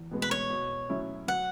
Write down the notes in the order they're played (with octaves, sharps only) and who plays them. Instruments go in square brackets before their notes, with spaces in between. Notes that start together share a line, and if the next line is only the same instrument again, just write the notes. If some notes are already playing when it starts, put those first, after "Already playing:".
Already playing: [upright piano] E2
B2 G#3 B3
[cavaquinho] B4
C#5
[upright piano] B2
F#3 C#4 E4
[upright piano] F#3 [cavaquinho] F#5